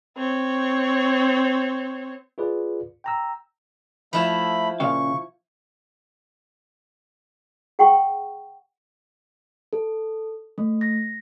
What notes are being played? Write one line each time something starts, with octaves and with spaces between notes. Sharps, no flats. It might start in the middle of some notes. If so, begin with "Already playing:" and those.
C4 C#5
F4 G#4 B4 D5
G5 A#5 E6
F3 A3 E4 A5 B5
A#2 C#3 F5 C#6
G#4 F#5 G5 C#6
A4
A3
A#6